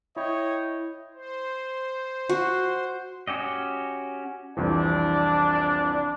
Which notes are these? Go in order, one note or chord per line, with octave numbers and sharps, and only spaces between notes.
E4 C#5 D#5 G5
C5
F#4
C#4 F#4 G4 D#5
C2 F2 E3 D4